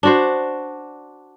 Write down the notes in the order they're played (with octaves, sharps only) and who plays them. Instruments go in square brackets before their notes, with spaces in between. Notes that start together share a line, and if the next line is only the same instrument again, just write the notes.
[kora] D4 F#4 C5